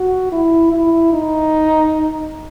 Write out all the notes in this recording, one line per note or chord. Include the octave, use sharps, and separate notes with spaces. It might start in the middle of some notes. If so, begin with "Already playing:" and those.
Already playing: F#4
E4
E4
D#4